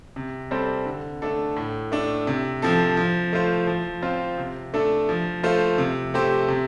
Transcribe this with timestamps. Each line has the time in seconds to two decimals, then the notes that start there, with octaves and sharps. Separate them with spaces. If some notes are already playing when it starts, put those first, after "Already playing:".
0.16 C3
0.51 G3 C4 A4 C5
0.86 D3
1.22 A3 D4 A4
1.56 A2
1.92 A3 D4
2.27 C3
2.62 F3 C4 A4
2.97 F3
3.33 A3 F4 C5
3.67 F3
4.02 C4 F4 C5
4.38 C3
4.74 A3 D4 A4
5.09 F3
5.43 A3 F4 C5
5.78 C3
6.14 A3 C4 G4 C5
6.48 C3